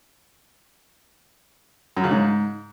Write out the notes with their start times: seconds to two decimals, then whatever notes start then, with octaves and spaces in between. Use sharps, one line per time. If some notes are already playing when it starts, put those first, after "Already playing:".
1.97 F#2
2.04 C#3
2.11 G#2